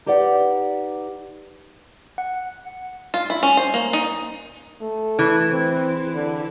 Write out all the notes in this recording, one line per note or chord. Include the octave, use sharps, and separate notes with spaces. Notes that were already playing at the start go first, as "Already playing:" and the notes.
D#4 G4 B4 D5 F#5
F#5
F4
E4
C#4
C5
A#3
D#4
A3
E3
C4
D3